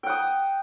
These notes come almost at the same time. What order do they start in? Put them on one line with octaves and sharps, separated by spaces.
G5 F#5 D#6